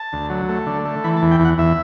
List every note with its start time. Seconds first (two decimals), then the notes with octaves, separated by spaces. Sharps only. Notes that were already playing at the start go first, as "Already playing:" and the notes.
Already playing: A5
0.13 D2
0.30 F#3
0.49 A3
0.66 D3
0.85 A3
1.04 E3 B5
1.17 A5
1.22 E2
1.31 G5
1.40 E2
1.45 F#5
1.58 E2 E5